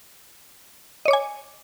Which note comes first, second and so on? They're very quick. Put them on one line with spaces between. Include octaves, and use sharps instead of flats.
D#5 C#5 D6 G#5